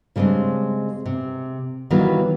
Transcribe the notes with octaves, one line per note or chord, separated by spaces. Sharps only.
C#3 G3 G#3 C4 D4
C3
D#3 E3 F#3 G3 A#3 B3